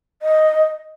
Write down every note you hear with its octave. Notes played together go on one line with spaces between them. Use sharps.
D#5